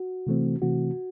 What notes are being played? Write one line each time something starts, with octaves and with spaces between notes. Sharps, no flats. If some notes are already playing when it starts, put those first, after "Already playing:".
Already playing: F#4
C3 E3 A3 C4
C3 E3 A3 C4 F#4